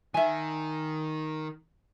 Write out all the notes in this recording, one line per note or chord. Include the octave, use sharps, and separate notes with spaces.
D#3 E5 G#5